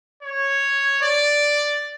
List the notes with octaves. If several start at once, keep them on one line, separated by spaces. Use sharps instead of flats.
C#5
D5